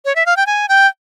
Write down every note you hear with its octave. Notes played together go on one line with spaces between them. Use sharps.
C#5
E5
F5
G5
G#5
G5